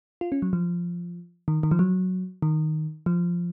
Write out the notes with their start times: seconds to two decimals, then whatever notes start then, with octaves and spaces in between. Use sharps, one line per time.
0.21 F4
0.32 C#4
0.42 F#3
0.53 F3
1.48 D#3
1.63 D#3
1.71 F3
1.79 F#3
2.42 D#3
3.06 F3